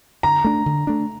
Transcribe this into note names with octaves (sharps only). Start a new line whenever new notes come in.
D3 A#5
A3 D4
D3
A3 D4